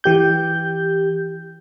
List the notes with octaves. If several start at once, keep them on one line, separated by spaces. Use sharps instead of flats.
E3 G4 G6